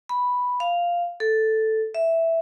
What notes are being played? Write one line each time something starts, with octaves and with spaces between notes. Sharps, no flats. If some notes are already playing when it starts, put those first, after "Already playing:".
B5
F5
A4
E5